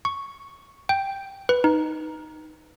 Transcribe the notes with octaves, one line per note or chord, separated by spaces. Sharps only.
C#6
G5
B4
D#4